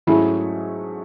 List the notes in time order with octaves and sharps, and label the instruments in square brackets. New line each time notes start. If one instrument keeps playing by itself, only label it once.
[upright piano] G#2 F#3 A3 C#4 G#4 [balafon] E4